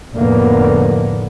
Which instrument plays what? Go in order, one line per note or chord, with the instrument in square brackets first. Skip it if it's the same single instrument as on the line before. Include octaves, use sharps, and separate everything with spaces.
[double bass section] F1 A2 D3 A#3 B3